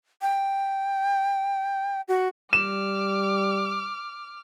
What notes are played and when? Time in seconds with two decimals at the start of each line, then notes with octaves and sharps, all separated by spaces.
0.22 G5
2.08 F#4
2.53 G3 D6 F6 E7